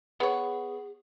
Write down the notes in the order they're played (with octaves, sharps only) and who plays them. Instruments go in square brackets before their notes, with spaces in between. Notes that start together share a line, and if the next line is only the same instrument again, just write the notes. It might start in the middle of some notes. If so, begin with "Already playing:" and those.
[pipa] B3 C#5 [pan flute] G#4